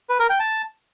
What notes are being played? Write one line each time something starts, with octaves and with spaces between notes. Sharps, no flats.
B4
A#4
G5
A5